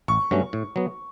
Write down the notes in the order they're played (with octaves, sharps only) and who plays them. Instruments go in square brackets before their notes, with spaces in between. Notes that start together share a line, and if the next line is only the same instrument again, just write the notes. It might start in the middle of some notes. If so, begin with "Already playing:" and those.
[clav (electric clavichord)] A1 [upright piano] C#6
[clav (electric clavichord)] G2 F#3 A3 C#4
A2
F#3 B3